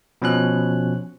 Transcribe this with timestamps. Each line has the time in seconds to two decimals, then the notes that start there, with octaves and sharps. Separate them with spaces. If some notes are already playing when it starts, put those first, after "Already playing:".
0.22 B2 F3 C#4 F#6